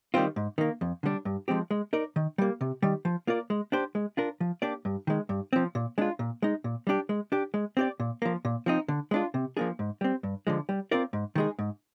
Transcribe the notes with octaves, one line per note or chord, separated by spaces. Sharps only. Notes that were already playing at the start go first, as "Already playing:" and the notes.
D#3 G3 C4 F4
G#2
D#3 A#3
F2
D3 G3 D4
G2
F3 G#3 C4 G4
G#3
D#4 A#4 D5
D#3
G3 A#3
C3
D#3 G3
F3
A#3 F4 A#4 D5
G#3
D4 G4 C5
G#3
D4 F4 A#4
F3
A#3 D4 G4 D5
G2
D#3 G#3
G2
F3 C4
A#2
G#3 D4 F4
A#2
G#3 D#4
A#2
G3 D4 G4
G#3
D4 G4
G#3
C4 G4 D5
A#2
F3 A#3
A#2
F3 C4 D#4
D3
G#3 D4 F4
C3
F3 A#3 D4 G#4
G#2
G3 C4
G2
D3 F3 G#3
G3
C4 F4 A#4 D5
G#2
D#3 G#3 D#4 G#4
G#2